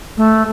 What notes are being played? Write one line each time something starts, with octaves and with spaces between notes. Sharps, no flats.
A3